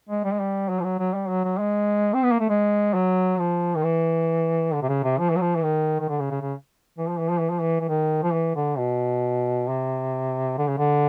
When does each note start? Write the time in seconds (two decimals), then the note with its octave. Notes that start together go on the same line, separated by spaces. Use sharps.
0.09 G#3
0.24 G3
0.32 G#3
0.40 G3
0.69 F#3
0.80 F3
0.84 F#3
0.99 F#3
1.14 G3
1.29 F#3
1.44 F#3
1.59 G#3
2.14 C4
2.22 B3
2.32 A#3
2.40 A3
2.49 G#3
2.94 F#3
3.39 F3
3.76 D#3
3.83 E3
4.73 D3
4.82 C3
4.88 C#3
5.03 C3
5.19 F3
5.30 E3
5.36 F#3
5.41 F3
5.55 E3
5.63 D#3
6.00 D#3
6.08 D3
6.19 C#3
6.31 C#3
6.42 C#3
6.98 E3
7.08 F3
7.19 E3
7.29 F3
7.40 E3
7.50 F3
7.60 E3
7.81 E3
7.88 D#3
8.23 F3
8.33 E3
8.56 D3
8.78 B2
9.68 C3
10.58 D3
10.67 C#3
10.78 D3